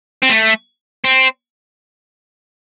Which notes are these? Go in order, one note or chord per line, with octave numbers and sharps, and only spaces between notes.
C4
A3
C4